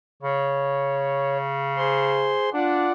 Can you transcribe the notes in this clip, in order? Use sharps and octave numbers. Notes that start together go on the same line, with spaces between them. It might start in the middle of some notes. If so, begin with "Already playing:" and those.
C#3 C#5
G#4 C5 C6
D4 F4 D5 F#5